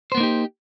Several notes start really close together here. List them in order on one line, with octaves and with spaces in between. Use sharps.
C5 B3 A#3 D#4 G4